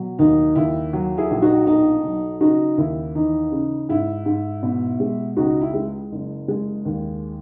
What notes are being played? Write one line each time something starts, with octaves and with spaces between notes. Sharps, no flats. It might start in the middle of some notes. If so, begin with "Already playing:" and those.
Already playing: B2 F#3
D#2 D#4
D#2 E4
F#3
E4 G#4
A#1
D#4 F#4
B1 D#4
F#3
C#3 D#4 F#4
D#2 E4
E3 D#4
C#3
G#2 E4
G#2
B2
G#3
C#2 D#4 F#4
E4
G#3
F#1
G#3
D#2